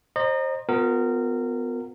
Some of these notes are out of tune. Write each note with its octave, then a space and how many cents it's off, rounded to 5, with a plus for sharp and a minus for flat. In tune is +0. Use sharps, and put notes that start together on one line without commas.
C5 +25 D#5 -35 A#5 +0
B3 +25 F4 +40 A#4 -20